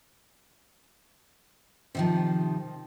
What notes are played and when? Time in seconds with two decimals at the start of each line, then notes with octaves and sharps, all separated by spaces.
1.95 C3 D#3 F3